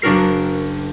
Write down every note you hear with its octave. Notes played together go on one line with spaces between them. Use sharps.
F#1 D4 F#4 A#4 C7